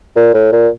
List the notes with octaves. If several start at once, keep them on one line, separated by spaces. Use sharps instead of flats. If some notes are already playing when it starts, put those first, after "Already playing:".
A#2
A2
A#2